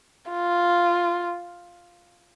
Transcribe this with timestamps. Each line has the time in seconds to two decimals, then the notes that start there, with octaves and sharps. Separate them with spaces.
0.30 F4